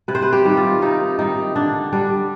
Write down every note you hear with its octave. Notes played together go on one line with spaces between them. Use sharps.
C3 B4
C5
B4
G4
D#3 G3
F4
C3 D#4
D#3 G3 D#4
D3 D4
G3 D4